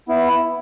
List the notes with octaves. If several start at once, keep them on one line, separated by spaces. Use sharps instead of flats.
B3 E4